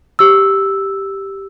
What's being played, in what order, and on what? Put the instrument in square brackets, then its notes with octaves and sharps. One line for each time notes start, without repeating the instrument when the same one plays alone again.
[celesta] G4 E6